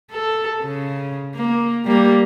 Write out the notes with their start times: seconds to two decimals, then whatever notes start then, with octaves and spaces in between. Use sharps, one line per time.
0.11 A4
0.62 C#3
1.35 A#3
1.85 G3 A#3